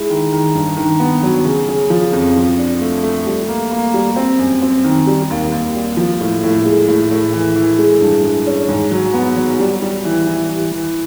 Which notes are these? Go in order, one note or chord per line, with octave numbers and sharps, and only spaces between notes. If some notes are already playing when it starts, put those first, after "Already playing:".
Already playing: G#3 E4
D#3
D#3
G2
D#3
B3
F#3
C#3
C#3
F3
F2
F3
D4
A3
A3
G3
A#3
A#3
G3
C4
F#2
C4
D#3
G3
D#2
D#2
G3
F3
A2
A2
G#3
A2
A2
E3
E3
G#3
G2
G#3
C#4
G#2
F#3
B3
F#3
G3
G3
E3
E3
E3
E3